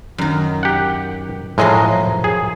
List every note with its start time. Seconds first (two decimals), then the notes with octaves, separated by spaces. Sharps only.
0.18 F#2 D#3
0.63 G4 F#5
1.58 A2 F3 F#3 G#3 A#4 D#5
2.24 G#4